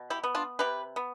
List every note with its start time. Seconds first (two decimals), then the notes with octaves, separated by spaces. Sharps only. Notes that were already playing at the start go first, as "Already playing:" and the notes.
Already playing: B2
0.10 E4 G4
0.24 B3
0.35 D4 F4
0.59 C3 G4 B4
0.96 B3